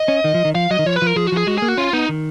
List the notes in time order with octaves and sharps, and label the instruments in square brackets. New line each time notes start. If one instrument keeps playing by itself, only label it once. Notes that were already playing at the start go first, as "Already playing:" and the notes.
Already playing: [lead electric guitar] D#5
[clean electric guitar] C#4
D#3
F3
D#3
[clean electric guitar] F3 [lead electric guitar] F5
[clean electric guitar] F#3 [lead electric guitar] D#5
[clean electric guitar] D#3
[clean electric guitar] F3 [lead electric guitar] C#5
[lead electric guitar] B4
[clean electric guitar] F3 [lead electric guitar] A#4
[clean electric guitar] F3 [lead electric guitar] G#4
[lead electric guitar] F#4
[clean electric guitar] F3
[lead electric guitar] G#4
[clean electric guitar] G#3 [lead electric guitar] F#4
[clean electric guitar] A#3 [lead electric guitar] G#4
[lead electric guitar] F#4
[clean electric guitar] C#4 [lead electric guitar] F4
[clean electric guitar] B3 [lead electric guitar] D#4
[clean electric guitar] D#3